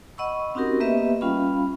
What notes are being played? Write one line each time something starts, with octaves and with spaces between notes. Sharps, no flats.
D#5 F#5 B5 C#6 E6
C4 C#4 D#4 F#4 G4 A#4
A#3 B3 G4 B4 D#5 E5
G3 C#4 F4 F5 B5